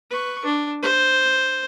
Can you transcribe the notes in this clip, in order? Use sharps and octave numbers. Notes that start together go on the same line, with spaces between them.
B4 C#6
D4
C5